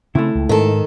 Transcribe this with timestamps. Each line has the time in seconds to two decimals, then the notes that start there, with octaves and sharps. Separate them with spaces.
0.15 C#3 A3 C4 E4
0.35 C#2
0.49 G#2 D#3 A4